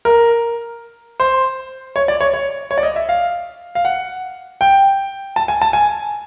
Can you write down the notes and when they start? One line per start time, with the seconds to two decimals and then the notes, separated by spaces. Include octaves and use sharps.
0.05 A#4
1.20 C5
1.96 C#5
2.08 D5
2.21 C#5
2.34 C#5
2.71 C#5
2.78 D5
2.83 D#5
2.96 E5
3.09 F5
3.75 F5
3.85 F#5
4.61 G5
5.36 A5
5.48 G#5
5.62 A5
5.73 G#5